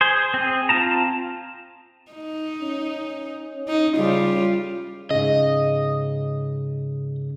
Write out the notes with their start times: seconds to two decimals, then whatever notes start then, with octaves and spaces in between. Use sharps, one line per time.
0.01 G#4 C5
0.34 C4 G#4
0.69 C4 F4 A5 A#5
2.12 D#4
2.61 C#4
3.68 D#4
3.97 C#3 G3 F4
5.11 G#2 C#3 D#5